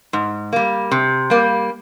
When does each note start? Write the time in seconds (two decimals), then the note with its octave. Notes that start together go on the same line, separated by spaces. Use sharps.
0.13 G#2
0.53 G3 A#3
0.92 C3
1.30 G3 A#3